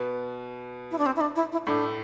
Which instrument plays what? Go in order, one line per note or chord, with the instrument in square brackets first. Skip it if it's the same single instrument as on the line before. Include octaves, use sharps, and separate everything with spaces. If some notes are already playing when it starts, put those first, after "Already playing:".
Already playing: [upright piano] B2 B3
[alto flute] E4
D4
C4
E4
D4
E4
E4
[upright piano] A2 A3 [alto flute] D4